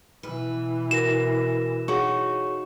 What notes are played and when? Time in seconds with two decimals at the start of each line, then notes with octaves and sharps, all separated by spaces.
0.23 B2 E3 B4
0.91 F#4 A#4 A#6 E7
1.88 D#4 F#4 G#4 C#5 F5 C#6